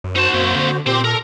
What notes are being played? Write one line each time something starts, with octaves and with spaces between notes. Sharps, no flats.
F#2
D#4 F#4 C5 A5
F#2 A#3 C4
D3
A#2 C4 G4 C5 C6
A4 A#4